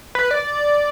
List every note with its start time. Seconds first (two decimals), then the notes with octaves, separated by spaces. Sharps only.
0.15 B4
0.31 D5